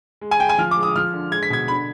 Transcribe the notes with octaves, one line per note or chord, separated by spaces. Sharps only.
G#3
G#5
G#3 G5
G#5
F3 F6
D6
G#3
D#6
F3 F6
D3
G#3 G#6
B6
B2 G#6
D3 B5